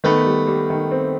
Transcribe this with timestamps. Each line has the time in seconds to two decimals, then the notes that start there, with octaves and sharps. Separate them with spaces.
0.04 D#3 A3 B3
0.26 G3
0.47 G3
0.70 D#3
0.91 C4